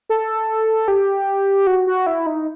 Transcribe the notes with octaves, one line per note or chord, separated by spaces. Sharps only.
A4
G4
F#4
F#4
E4
D#4